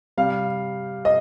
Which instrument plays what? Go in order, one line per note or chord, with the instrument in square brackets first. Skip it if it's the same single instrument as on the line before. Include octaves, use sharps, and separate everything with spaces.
[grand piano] C3 G3 F5
D#5